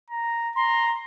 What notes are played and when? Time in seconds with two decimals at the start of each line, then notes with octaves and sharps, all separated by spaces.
0.10 A#5
0.56 A#5 C6